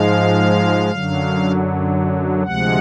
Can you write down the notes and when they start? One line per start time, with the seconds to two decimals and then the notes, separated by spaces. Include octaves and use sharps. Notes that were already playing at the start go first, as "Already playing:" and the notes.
Already playing: G#2 F3 G#3 F5
0.91 F#2 D3 F#3
2.43 D2 C3 F3 G#3 F#5